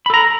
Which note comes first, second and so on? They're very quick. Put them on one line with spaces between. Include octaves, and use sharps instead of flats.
B5 A4 A#5